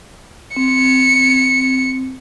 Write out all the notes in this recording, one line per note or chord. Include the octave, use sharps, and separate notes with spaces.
C4 C#7